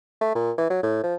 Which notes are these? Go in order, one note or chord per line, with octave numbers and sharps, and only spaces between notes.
A3
A#2
E3
F#3
A2
F3